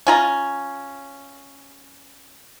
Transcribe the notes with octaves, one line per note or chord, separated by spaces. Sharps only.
C#4 F4 A#5